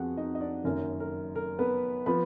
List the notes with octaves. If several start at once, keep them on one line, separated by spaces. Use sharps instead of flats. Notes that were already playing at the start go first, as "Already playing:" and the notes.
Already playing: F2 F3 B3 F#4 G#4 F#5
D#4 D#5
D#5
D4 D5
F#1 F#2 D#3 A#3 A#4
A#4
A#4
B3 B4
F3 B3 B4 B5